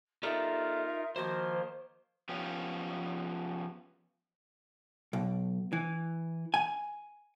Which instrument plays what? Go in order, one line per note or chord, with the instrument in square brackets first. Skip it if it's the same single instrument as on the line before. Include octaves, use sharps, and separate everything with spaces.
[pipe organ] D#4 F4 A#4 [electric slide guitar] G4 A4 D5 [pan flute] E5
[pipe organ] D#3 F3 A#3 [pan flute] F#4 [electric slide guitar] C5
[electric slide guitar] F3 B3 C#4 G4
[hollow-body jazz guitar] B1
E3
G#5